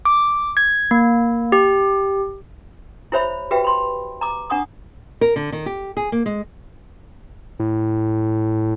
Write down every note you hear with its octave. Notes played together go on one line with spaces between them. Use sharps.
D6
G#6
A#3
G4
E4 G4 C5 C#5 E5 B5
F#4 G4 B4 E5 G5
B5 C6
A#5 D6
D4 F#5 C#6 D#6
A#4
D3
D#3
G4
G#4
A#3
G#3
A2